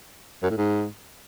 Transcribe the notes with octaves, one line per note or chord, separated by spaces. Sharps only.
F#2
A2
G#2